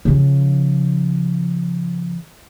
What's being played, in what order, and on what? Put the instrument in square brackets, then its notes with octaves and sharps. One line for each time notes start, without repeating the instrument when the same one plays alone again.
[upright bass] C#3 F3